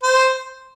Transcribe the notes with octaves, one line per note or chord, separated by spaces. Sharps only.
C5